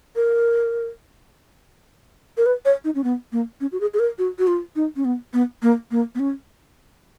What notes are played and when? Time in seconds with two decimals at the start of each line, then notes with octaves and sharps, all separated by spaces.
0.16 A#4
2.37 A#4
2.46 B4
2.65 C#5
2.84 D#4
2.95 C#4
3.04 B3
3.32 A#3
3.61 C#4
3.72 F#4
3.80 G#4
3.94 G#4
3.99 A#4
4.19 F#4
4.39 F#4
4.47 F4
4.76 D#4
4.96 C#4
5.05 B3
5.33 B3
5.62 A#3
5.91 A#3
6.15 B3
6.19 C#4